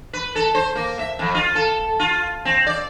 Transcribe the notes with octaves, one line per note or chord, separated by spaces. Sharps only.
B4
A4
C5
A#3
E5
F2
F4
A4
F4
C4
D5